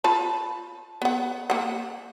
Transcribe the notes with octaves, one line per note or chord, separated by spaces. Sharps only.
F4 A5 B5
B3 F#5
A#3 F#5